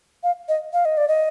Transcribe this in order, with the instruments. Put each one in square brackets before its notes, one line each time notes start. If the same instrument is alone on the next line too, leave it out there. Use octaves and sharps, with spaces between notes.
[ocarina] F5
D#5
F5
D#5
D5
D#5